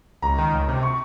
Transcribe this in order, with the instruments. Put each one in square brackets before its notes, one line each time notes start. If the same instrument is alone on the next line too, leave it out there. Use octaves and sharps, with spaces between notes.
[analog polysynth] C#2 [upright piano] A#5
[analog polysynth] D#3
C#2
C3
[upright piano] C#6